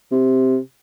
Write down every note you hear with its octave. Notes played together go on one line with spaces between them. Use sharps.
C3